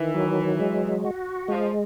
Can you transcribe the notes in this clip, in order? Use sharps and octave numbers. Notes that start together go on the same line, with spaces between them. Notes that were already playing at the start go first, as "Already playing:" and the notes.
Already playing: D#3 E3
F#3
G#3
F#4
F3 G#3